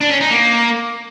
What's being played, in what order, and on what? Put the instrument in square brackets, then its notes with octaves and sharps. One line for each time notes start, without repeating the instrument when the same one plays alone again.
[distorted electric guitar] D4
C#4
D#4
A#3